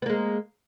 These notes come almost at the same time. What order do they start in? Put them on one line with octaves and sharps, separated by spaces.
B3 A#3 G#3